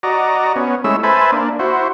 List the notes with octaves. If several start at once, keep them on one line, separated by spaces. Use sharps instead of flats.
F#4 D5 D#5 A#5
B3 C#4
G#3 A3 C#4 E4 E6
B4 C5 E5 G#5 A5 B5
A#3 D4
E4 F#4 C5